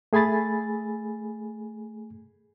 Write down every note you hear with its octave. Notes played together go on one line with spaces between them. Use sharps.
A3 G#4 G#5 B5 A6